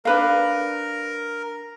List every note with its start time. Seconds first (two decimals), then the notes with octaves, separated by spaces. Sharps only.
0.05 D4 A#4 B4 F5